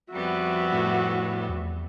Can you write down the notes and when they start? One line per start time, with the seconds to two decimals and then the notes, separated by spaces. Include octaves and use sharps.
0.12 F2 G3 B3 F#4 E5
0.72 A2
1.49 E2